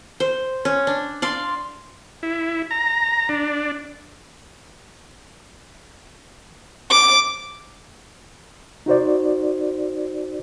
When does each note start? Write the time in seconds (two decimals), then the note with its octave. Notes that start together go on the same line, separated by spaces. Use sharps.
0.20 C5
0.65 C#4
0.87 D4
1.22 D5 F5 C6
2.23 E4
2.71 A#5
3.29 D4
6.91 D6
8.86 D#4 F#4 C5 D5